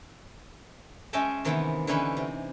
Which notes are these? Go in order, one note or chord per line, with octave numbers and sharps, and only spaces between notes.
G#3 C#4 D#5 E5 G5 A5
C3 D#3 E3 A#3 B3
D3 E3 C#4 D#4 B4 B5
C3